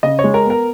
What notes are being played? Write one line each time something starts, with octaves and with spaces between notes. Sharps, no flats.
C#3 D#5
C#5
G#3
A#4
B3 A#4